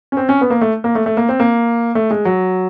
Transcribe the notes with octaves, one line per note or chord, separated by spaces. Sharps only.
C#4
C4
C#4
B3
A#3
A3
A#3
A3
A3
A#3
C4
A#3
A3
G#3
F#3